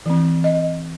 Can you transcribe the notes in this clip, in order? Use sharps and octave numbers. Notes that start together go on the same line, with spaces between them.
E3 C4
D#5